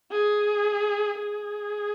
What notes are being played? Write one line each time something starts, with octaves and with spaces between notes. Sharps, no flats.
G#4
G#4